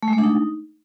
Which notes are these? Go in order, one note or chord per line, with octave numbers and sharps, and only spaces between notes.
A3
G#3
A3
D4
D#4